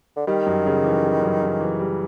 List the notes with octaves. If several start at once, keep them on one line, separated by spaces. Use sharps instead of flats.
D3
D#3 G3
F#2
C#3
E3
G3
F#2
C#3
E3
G3